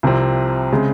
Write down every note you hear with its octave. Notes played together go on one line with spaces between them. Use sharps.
C2 C3 F3 C4
C#3 G#3 C4